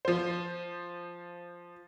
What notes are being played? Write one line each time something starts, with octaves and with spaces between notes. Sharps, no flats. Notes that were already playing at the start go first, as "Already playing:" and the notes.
F3 C5